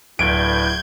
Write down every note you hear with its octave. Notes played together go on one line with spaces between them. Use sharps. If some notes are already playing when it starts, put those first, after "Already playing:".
D1 A2 B4 D5 G6 G#6 D7